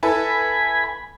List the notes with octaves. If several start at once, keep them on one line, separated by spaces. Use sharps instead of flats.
E4 A4 B4 G#5 B5